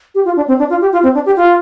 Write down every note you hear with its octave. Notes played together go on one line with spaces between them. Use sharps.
G4
F4
D4
C4
D4
F4
G4
F4
C4
D4
G4
F4